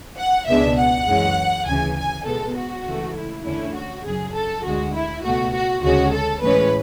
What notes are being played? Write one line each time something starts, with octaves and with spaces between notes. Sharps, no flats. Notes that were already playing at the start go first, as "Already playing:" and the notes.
F#5
C#2 B2 G#3 B3 D4 E5
F#5
F#2 E3 G#3 C#4
D2 C#3 E3 G#5
G#5
B2 G#3 B3 A4
F#4
C#2 C#3 E3 A3
E4
E2 D3 A3 C#4 E4
F#4
F#2 C#3 F#3 G#4
A4
D2 D3 G#3 F#4
E4
C#2 B2 A3 F#4
F#4
D2 C#3 G#3 C#4 F#4
A4
A2 E3 G#3 C#4 B4